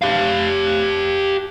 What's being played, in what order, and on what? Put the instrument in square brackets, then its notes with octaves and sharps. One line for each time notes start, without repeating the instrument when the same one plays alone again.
[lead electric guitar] G4 F5